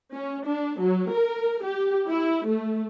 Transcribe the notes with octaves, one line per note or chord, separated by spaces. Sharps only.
C#4
D4
F#3
A#4
G4
E4
A3